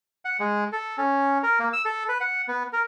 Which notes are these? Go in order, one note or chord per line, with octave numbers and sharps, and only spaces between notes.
F#5
G#3
A4
C#4
A#4
A#3
E6
A4
B4
F#5
B3
A#4